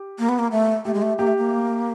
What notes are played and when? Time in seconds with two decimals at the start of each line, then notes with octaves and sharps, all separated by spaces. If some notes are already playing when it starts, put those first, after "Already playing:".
Already playing: G4
0.19 A#3
0.29 B3
0.39 A#3
0.51 A3
0.85 A3 G4
0.94 G#3
1.02 A3
1.18 A#3 G4
1.27 A3
1.37 A#3